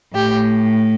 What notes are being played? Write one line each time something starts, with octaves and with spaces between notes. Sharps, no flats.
A2 G4